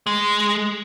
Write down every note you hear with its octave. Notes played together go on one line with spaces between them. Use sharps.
G#3